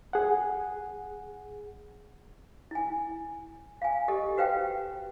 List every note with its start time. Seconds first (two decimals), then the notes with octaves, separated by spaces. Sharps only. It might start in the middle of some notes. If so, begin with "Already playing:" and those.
0.13 G#4 F#5
2.71 E4 G#5
3.82 F5 G#5
4.08 G4 A4 D#5
4.37 F#4 B4 C5 F5 G5